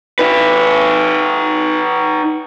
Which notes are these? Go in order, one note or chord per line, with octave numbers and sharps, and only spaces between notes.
D#4 B4